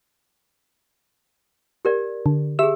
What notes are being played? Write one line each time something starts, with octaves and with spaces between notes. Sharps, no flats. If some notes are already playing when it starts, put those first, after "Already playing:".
G4 A#4 D5
D3
G4 G#4 E5 E6